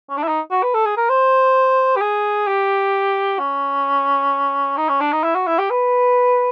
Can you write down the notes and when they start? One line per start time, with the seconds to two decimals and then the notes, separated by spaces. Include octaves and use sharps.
0.09 C#4
0.17 D4
0.23 E4
0.28 D#4
0.51 F#4
0.63 B4
0.74 A4
0.85 G#4
0.97 A#4
1.09 C5
1.96 G4
2.01 G#4
2.47 G4
3.39 C#4
4.77 D#4
4.89 C#4
5.00 D4
5.12 D#4
5.23 E4
5.35 F#4
5.47 E4
5.58 G4
5.70 B4